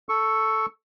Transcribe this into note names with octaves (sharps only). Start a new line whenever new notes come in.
A4 C#6